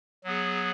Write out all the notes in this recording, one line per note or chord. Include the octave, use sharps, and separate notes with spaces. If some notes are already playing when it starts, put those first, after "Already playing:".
F#3 B3 G#4